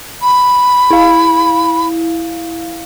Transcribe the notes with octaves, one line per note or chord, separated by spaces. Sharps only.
B5
E4 F5